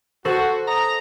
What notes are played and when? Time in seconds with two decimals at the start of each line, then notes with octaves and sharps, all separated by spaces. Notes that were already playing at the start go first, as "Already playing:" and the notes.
0.25 F#4 A4 C5
0.68 D#5 A#5